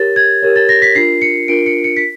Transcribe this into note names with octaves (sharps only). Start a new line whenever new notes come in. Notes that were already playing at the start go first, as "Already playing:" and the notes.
Already playing: G4 A#4 C#5 A6
G#6
G4 A#4 C#5
A6
A#6
B6
D4 F4 A#4 C7
C#7
D4 F4 A#4 D7
C#7
C#7
B6